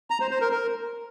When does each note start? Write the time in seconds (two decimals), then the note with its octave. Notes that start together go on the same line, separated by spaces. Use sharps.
0.10 A#5
0.21 C5
0.31 C5
0.41 A#4
0.51 A#4